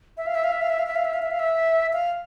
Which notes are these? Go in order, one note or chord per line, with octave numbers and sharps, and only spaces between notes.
E5
F5
E5
F5
E5
F5
E5
F5
E5
F5
E5
F5
E5
F5
E5
F5